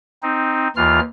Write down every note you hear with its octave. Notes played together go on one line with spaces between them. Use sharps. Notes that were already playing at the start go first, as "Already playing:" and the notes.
C4 D#4
D#2 E3 F4 F6